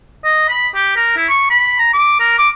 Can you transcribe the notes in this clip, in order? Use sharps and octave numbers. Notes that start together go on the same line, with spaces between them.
D#5
B5
G4
A#4
E4
C#6
B5
A#5
D6
A#4
D6